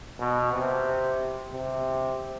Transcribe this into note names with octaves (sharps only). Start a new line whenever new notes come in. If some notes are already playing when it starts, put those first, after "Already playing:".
B2
C3
C3